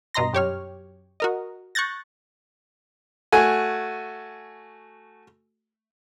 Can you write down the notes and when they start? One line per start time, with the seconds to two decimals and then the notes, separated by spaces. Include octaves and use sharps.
0.14 G2 B2 D#5 A#5 C6 A#6
0.33 F#2 G4 C#5 F6
1.20 F#4 A#4 D#5
1.75 C#6 F#6 G6 A6 A#6
3.32 A3 F#4 G#5